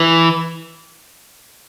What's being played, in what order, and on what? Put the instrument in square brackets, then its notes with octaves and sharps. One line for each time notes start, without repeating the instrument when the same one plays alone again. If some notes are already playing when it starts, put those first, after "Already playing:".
Already playing: [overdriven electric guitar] E3